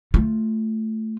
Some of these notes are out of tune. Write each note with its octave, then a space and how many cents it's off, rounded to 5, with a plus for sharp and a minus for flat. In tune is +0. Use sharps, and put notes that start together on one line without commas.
A3 +0 F4 +0